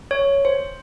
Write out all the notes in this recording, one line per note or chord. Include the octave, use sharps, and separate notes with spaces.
C#5
C5